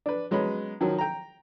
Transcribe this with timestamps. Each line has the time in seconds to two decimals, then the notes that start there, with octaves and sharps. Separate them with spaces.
0.06 D4 B4
0.31 F#3 G#3 B3 C#4 B5
0.81 D#3 F3 F#3
0.98 G5 A#5